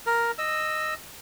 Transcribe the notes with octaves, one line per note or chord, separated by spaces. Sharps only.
A#4
D#5 E6